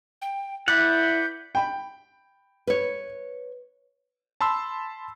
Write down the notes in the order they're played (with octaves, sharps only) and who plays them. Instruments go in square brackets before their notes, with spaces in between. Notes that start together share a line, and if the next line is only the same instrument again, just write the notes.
[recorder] G5
[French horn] E4 [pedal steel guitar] B4 D5 F#5 [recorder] G6
[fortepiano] G5 B5
[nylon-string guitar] B4 C#5
[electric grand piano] A5 B5 C6 E6